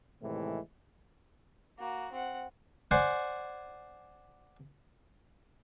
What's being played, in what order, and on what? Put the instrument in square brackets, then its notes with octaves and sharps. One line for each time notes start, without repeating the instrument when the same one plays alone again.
[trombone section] A2 C3 D#3 E3 G#3
[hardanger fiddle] A#3 F#4
C4 F#5
[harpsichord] C5 D5 F#5 G#5